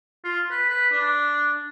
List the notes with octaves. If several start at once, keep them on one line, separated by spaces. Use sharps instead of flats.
F4
B4
B4
D4